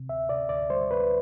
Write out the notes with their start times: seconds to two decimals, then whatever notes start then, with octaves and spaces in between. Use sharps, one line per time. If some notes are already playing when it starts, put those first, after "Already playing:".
Already playing: C3
0.09 D2 E5
0.29 C3 D5
0.49 D2 D5
0.70 G3 C5
0.91 D2 B4